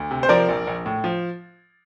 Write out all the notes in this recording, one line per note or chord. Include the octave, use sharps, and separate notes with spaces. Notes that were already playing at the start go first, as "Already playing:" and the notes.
Already playing: D2
C3
C5
F3 A#4 D5
A#1
A#1
A2
F3